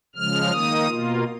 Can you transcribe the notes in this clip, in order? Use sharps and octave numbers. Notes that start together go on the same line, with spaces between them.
C#3 F3 G#3 F6
D#3 A#3 D#4 D#6
B2 A#3 F4